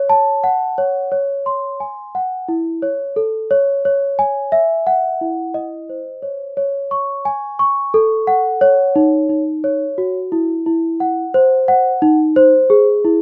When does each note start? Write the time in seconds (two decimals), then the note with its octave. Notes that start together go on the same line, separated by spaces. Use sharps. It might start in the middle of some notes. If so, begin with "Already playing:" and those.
Already playing: C#5
0.09 A5
0.44 F#5
0.78 C#5
1.12 C#5
1.46 C6
1.80 G#5
2.15 F#5
2.48 E4
2.82 C#5
3.16 A4
3.51 C#5
3.85 C#5
4.19 G#5
4.52 E5
4.87 F#5
5.21 E4
5.54 D#5
5.89 C5
6.22 C#5
6.57 C#5
6.91 C#6
7.25 G#5
7.59 C#6
7.94 A4
8.27 F#5
8.61 C#5
8.96 D#4
9.30 D#4
9.64 C#5
9.98 F#4
10.32 E4
10.66 E4
11.00 F#5
11.34 C5
11.68 F#5
12.02 D#4
12.36 C5
12.70 G#4
13.05 E4